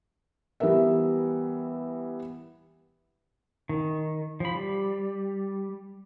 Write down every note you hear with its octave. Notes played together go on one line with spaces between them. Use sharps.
E3 G3 B3 A#4 E5
D#3
F3 B5
G3